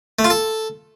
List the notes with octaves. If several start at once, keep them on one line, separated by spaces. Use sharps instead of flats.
A3
F4
A4